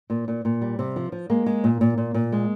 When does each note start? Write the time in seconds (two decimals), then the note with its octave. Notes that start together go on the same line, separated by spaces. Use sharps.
0.10 A#2
0.28 A#2
0.45 A#2
0.61 G3
0.79 C3
0.96 F3
1.12 F3
1.30 G#3 A#3
1.46 G#3
1.64 A#2
1.81 A#2
1.98 A#2
2.14 A#2
2.32 G#3